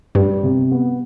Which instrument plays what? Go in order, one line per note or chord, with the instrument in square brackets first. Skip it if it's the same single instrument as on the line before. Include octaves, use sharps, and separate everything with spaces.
[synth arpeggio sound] G2 [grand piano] G3
[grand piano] C3
B3